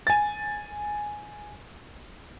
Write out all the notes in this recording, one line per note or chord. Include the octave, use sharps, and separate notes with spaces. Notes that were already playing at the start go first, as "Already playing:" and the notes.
G#5 A6